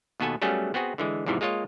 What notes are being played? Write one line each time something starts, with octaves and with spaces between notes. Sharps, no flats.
D#2 B2 B3 A4 G#5
F#3 G3 A3 B3 C#4 G#4
B3 C4 F#4 G#4
D3 E3 G#3
E2 G#2 C3 E3 F3
G#3 A#3 F4 C#5 D#5